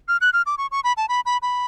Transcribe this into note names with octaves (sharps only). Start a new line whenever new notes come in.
F6
F#6
F6
D6
C#6
C#6
B5
A5
B5
B5
B5